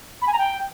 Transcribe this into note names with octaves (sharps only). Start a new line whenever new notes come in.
B5
G#5
A#5
G5